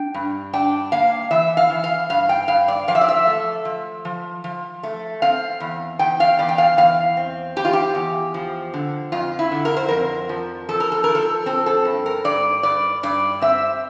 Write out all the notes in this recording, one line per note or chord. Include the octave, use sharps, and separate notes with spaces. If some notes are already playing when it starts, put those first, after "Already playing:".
Already playing: D4 G5
G2
D4 G5
A#3 F5
E3 E5
F5
E3
F5
G2 F5
G5
G2 F5
D5
F3 F5
E5
D5
E5
A3
F3
F3
F3
A3
C4 F5
E2
E2 G5
F5
E2 D5
G5
F5
E2 F5
C4
E2 G4
F4
G4
E2
F3
D3
F2 F4
E4
D3
A#4
C5
F2 A#4
F3
F3 A4
A#4
A4
F3 A#4
A4
C4 A4
A4
G2
A#4
G2 D5
G2 D5
G2 D5
C4 E5